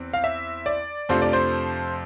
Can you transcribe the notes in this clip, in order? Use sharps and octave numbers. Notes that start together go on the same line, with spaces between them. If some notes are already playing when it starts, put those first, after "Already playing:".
Already playing: E2 E3 C4
F5
E5
D5
F2 C3 F3 A3 D4 C5
D5
C5